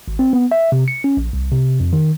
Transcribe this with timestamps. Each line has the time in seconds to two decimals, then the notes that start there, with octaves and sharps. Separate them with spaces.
0.08 G#1
0.19 C4
0.33 B3
0.52 E5
0.72 C3
0.88 C#7
1.04 C#4
1.17 A#1
1.33 C2
1.52 C3
1.80 F2
1.93 D#3